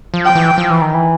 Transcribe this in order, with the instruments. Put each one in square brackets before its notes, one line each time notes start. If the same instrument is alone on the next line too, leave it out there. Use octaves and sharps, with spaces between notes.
[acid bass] F3
[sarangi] G5
[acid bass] E3
F3
E3
D#3
E3